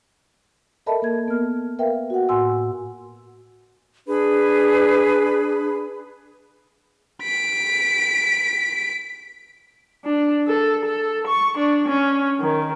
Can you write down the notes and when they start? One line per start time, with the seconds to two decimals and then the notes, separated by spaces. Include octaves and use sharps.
0.86 A4 A#4 D#5 E5 A5 B5
1.02 A#3 A#4 G#6
1.28 B3 A#4 F6
1.79 A#4 B4 E5 F5 G5
2.10 F#4 F#5
2.29 A2 F#4 F#5 G#5 C6 E6
4.07 D4 G#4 B4 B5
7.23 B6 D7
10.05 D4
10.47 A4
10.85 A4
11.28 C#6
11.58 D4
11.88 C#4
12.40 D#3